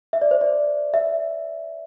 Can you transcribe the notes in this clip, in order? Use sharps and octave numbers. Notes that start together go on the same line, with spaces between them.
E5
D5
C5
D5
E5